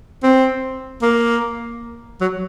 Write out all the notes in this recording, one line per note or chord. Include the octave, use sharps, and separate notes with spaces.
C4
A#3
F#3